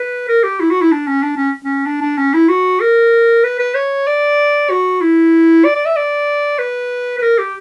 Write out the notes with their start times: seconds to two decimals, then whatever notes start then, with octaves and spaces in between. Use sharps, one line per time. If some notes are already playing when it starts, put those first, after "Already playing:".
Already playing: B4
0.28 A#4
0.43 G4
0.60 E4
0.70 F#4
0.81 E4
0.92 D4
1.07 C#4
1.23 D4
1.37 C#4
1.65 C#4
1.86 D4
2.01 D4
2.17 C#4
2.34 E4
2.48 F#4
2.81 A#4
3.44 B4
3.59 B4
3.75 C#5
4.07 D5
4.70 F#4
5.01 E4
5.65 D5
5.75 D5
5.86 E5
5.96 D5
6.59 B4
7.19 B4
7.22 A#4
7.38 G4